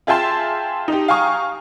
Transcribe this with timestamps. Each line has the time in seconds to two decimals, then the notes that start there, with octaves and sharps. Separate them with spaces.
0.07 F4 G#4 E5 G5 A5 C6
0.88 D#4 G4
1.08 F5 G5 G#5 A#5 C#6 D#6